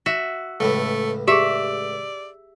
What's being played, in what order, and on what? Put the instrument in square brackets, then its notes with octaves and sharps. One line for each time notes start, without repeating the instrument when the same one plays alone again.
[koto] F#4 E5
[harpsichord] C#2 A2 E3 [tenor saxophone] A3
[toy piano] G4 G#4 [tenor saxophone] D5 [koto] E5